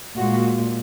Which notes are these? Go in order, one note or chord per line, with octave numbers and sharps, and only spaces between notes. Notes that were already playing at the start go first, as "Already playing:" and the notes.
A#2 G#3 F#4